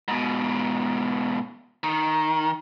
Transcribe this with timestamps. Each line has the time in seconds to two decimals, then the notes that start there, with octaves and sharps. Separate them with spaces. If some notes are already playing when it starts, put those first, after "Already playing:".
0.08 G#2 B2
1.83 D#3